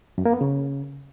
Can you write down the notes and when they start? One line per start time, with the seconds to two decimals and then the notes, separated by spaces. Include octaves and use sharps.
0.18 F#2
0.25 A#3
0.33 B3
0.41 C#3